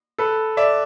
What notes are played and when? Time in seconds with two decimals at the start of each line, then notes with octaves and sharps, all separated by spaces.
0.18 A4 B4
0.57 D5 E5